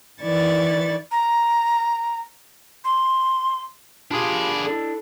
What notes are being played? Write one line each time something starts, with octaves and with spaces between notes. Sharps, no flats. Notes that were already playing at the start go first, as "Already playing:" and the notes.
D#3 E3 E4 D5 C#6 A6
A#5
C6
D4 F4 G4 G#4 F5 B5
D4 E4 A4